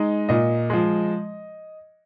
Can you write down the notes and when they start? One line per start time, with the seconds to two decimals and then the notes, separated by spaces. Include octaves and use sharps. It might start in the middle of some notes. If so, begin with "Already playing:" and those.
Already playing: G#3 D#4
0.29 A#2 D#5
0.70 F3 G#3